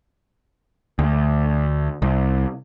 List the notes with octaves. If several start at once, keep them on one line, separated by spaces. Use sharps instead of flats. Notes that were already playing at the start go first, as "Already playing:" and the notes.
D2
C2